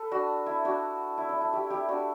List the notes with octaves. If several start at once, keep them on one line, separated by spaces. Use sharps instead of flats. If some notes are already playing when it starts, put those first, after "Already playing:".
Already playing: A4 B4
D4 F#4
E4
D4 F#4
E4
D4
E4
E4 G4
E4 G4
D4 F#4